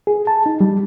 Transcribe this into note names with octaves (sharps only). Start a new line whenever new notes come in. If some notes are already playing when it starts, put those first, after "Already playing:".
G#4
A5
D#4
G3